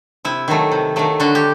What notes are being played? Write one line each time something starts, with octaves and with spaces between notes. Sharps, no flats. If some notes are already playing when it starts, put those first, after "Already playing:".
C3 E4
D#3 F#3 A3
C3
D#3 F#3 A3
D3 F#4
G4